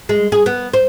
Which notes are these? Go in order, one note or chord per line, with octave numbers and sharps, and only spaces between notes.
G#3
G#4
B3
C5